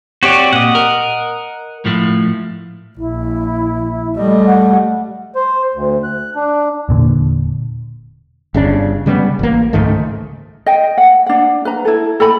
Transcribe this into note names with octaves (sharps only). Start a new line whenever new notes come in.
C4 F#4 G4 C#5 D5
A#2 D#5 F#5
A#4
A2 F3 A3
A#1 E4
G3 A3 D#5
F#5
C5
D2
F#6
D4
E1 A#2 D3
G1 C#3 D4
C#3 G3 A3 B3
A1 A#3
C#2 G#2 D#3 A3
D#5 G5
F#5
D4 F#5
B4 A#5
E4 A4
A4 G#5 B5